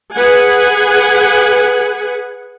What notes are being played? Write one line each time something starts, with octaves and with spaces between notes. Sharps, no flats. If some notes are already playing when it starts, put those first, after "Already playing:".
G#4 B4 F#5 G#5